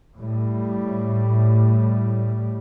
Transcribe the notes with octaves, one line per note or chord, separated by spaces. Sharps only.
A2 G3